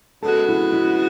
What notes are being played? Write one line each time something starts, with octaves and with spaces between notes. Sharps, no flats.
C#3 G#3 B3 F#4 A4
E4
E4